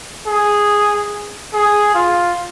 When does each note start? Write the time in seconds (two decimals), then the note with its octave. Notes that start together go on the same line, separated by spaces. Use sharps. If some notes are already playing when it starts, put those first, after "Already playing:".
0.27 G#4
1.53 G#4
1.95 F4